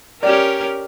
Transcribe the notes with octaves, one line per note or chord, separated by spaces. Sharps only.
C#4 G4 A#4 D5